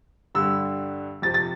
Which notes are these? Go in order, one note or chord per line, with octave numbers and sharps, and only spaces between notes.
G2 D3 G3 E6
F2 C3 F3 A6
A6